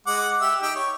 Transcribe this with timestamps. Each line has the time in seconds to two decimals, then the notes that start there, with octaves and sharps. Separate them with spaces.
0.07 G#3 F#5 D6
0.41 G4 E5 E6
0.62 D#4 G4 G5
0.76 C#5